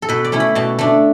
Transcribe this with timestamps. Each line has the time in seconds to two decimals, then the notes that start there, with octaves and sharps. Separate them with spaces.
0.02 A4
0.09 B2 B4
0.25 D5
0.32 A3 C#4 E4
0.40 B5
0.55 B2 A5
0.79 A3 D4